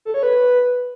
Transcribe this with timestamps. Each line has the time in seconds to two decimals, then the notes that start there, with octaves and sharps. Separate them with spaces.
0.05 A4
0.14 C#5
0.23 B4